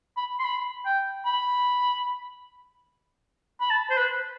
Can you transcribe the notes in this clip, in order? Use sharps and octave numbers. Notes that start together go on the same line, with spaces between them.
B5
C6
B5
G5
B5
B5
A5
C5
B4